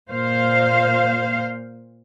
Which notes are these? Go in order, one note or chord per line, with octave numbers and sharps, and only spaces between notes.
A#2 C5 F5